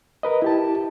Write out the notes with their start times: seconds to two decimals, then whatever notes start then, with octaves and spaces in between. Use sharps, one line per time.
0.23 A#4 B4 D#5
0.42 E4 G4 A5